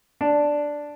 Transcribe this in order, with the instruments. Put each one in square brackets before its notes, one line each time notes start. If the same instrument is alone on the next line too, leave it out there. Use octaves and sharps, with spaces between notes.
[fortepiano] D4